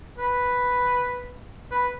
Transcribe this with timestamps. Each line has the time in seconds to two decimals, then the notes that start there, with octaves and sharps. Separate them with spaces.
0.18 B4
1.71 B4